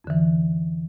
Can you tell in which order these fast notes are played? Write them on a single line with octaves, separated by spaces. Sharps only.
F2 D3 E3